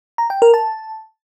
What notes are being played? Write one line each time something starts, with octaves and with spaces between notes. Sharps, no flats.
A#5
G5
A#4
A5